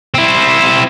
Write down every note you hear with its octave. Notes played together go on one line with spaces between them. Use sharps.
C4 E4